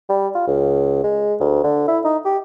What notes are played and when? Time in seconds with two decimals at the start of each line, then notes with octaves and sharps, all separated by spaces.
0.09 G3
0.35 F4
0.47 C#2
1.04 G#3
1.40 D2
1.64 D3
1.88 E4
2.05 D#4
2.25 G4